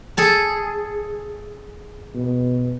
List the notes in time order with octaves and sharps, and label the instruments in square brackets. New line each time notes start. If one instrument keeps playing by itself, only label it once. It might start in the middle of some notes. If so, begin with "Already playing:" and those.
[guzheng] G#4 A4 A5
[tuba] B2